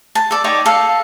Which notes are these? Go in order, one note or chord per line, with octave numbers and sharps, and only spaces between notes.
A5
A4 D5
D#4 G4 C#5 D5
A4 F5